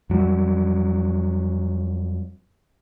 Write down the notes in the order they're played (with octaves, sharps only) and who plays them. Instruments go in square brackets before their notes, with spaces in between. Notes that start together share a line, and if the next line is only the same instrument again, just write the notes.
[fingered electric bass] F2 F#3 G3